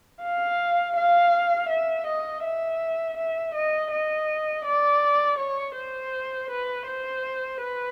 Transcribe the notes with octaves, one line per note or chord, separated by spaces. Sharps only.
F5
F5
E5
D#5
E5
E5
D#5
D#5
D5
C#5
C5
B4
C5
B4